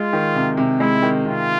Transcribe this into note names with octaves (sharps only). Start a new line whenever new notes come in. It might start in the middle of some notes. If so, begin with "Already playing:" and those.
Already playing: G#3 F4
D#3
C3
C3
G#3 E4
D#3
C3 F4